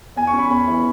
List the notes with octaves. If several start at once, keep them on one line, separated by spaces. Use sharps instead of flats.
E2 G#5
C#6
C#4
B5
E2 B5
E3